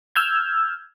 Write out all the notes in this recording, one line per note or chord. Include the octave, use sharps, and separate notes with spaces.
E6 F6 G6 G#6